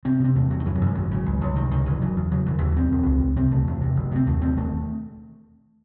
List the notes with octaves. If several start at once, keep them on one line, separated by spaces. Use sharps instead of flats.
C3 C4
C3 C4
E2 A3
C3 F#3
D#3
F#2 E3
F#3
F#2
G#3
G#1 F#3
C#3
C#2
C#2
C3 D#3
C#2 D#3
F#1 E3
C#3 F#3
E2
C#3 F#3
E1 E3
D#2 F#3
D#2 C4
E1
C#2
C#2
C3 C4
C#2 A3
E2
C3
F#1
C3 C4
D#2 A3
D#2 C4
E1 A3